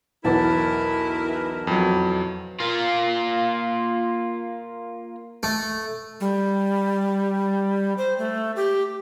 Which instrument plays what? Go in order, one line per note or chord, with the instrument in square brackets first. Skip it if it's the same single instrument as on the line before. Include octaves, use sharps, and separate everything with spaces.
[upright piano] B1 E2 [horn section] E4 A#4 B4 [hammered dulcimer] A5
[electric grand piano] F2 F#3
[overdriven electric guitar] A#3 F4
[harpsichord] A3
[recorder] G3
C5
A3
G4